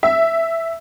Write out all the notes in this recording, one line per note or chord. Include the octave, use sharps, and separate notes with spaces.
E5